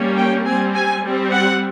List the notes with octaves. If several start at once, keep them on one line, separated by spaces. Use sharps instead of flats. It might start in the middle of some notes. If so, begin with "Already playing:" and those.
Already playing: G3 A#3 C#4
G5
G3 C4 G#5
G#5
G3 C4
F#5